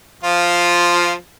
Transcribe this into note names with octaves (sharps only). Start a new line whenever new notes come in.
F3 F4